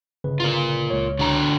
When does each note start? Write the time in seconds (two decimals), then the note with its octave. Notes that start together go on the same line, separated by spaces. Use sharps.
0.24 G1 C#3 B4
0.40 F4 A#4
0.90 C#2 C#5
1.19 D3 F#4 A#5